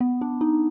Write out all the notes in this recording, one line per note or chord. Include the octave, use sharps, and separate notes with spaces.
B3
D4
D#4